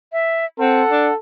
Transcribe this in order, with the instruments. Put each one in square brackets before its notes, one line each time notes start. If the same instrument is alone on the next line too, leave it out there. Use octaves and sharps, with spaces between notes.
[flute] E5
[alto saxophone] C4 [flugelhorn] A4 [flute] F#5
[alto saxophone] D4